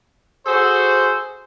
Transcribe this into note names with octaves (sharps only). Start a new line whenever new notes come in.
F#4 G#4 A4 C5